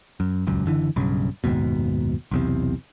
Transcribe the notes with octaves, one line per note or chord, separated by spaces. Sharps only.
F#2
D#1 C#2 F#2
F#1 D3 E3
B1 G2 C#3
F#1 D#2 G#2 B2
B1 E2 C3